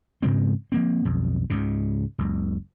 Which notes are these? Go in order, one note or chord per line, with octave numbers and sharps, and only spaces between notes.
G#2 C#3 G#3 C4
F3 A#3 C4
B1 F2
C#2 G#2 C#3
F#1 C#2